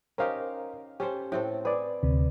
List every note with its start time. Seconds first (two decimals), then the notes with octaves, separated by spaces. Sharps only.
0.18 C#4 D#4 G4 A#4 C5 F5
1.00 C#4 G4 A4 C5
1.32 A2 C4 A4
1.65 G#4 B4 D5
2.03 D2 C3